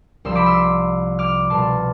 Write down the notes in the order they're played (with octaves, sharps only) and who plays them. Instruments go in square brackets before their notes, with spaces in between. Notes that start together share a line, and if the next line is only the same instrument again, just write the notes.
[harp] C2 C3 F3 C6 E6
B5 D6
C6 E6
D6 F6
C2 B2 G3 A5 C6